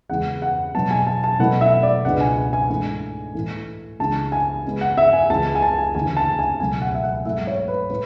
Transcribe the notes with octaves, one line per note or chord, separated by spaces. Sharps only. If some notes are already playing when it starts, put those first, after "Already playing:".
E2 C#3 G#3 B3 E4 F#5
F#5
B2 F#3 B3 A5
G#5
A5
A5
B2 F#3 A3 E4 F#5
E5
D5
C#2 B2 G#3 B3 D4 F#5
G#5
G#5
G#5
G#2 E3 A3 D4
A2 E3 A3
C#2 C#3 E3 G#3 D4 A5
G#5
C#3 G#3 B3
F#5
E5
G#5
C#2 C#3 E3 A5
G#5
A5
G#5
D2 C#3 E3 G#5
A5
G#5
C#2 B2 F#3 A3 G#5
F#5
E5
F#5
G#2 F#3 A3 E4 E5
C#5
B4
A2 B4